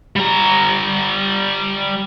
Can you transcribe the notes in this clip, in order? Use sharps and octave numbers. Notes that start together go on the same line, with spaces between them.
G3 A#5